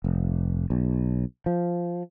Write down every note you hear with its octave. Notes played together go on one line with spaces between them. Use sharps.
F1
B1
F3